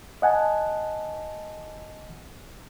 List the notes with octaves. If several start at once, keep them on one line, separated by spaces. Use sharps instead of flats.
D#5 F#5 G#5 A5